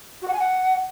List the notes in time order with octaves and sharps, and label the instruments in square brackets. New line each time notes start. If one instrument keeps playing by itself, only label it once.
[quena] F#4
F#5
G#5
F#5